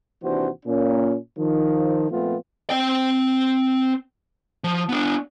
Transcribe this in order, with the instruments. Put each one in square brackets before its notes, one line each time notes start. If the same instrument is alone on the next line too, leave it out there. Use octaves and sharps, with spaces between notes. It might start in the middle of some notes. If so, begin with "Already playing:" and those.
[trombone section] D#2 C3 E3 D4 F#4 C5
A#2 C#4
D#3 F3
A#2 F3 A3 B3 C4 F4
[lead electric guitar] C4 G5
F3
B3 D4